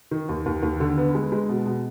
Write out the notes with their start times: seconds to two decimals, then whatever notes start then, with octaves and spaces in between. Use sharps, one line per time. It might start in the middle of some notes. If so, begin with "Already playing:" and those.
0.11 D#3
0.29 D#2
0.46 D#2
0.63 D#2
0.80 D3
0.97 B3
1.15 G#3
1.32 G#3
1.49 B2
1.66 B2